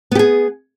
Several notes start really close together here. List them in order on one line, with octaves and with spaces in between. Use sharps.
B3 G4 G#4